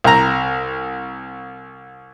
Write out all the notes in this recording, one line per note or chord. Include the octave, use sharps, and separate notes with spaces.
C2 A#5